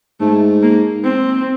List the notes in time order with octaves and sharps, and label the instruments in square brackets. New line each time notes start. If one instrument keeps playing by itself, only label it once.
[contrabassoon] G#2 [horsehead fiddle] A3
[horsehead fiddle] A#3
C4